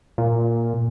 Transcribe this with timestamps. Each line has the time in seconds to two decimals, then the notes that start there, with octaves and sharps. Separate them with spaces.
0.18 A#2